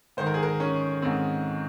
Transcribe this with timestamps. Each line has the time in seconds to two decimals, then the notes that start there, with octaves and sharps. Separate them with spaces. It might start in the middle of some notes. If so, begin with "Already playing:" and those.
0.17 G#2 D#3 C5
0.26 A#4
0.34 G#4
0.43 A#4
0.60 C#4
1.02 G#2 D#3 C4